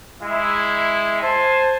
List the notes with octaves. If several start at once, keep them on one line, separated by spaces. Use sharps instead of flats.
G#3 E4
C5 G#5 A5